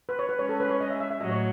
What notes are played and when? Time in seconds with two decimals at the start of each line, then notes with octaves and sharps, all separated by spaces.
0.09 B4
0.19 C#5
0.29 B4
0.39 G#3 C#4 G#4 C#5
0.49 A4
0.60 B4
0.70 C#5
0.81 D#5
0.90 E5
1.00 E5
1.11 E5
1.21 A2 F#3 D#5
1.31 C#5